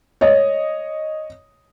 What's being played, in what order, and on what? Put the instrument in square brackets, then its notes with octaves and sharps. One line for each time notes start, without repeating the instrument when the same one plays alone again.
[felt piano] C#5 D#5